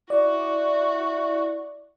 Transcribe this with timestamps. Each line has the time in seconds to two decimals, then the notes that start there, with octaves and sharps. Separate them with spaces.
0.10 E4 F#4 D5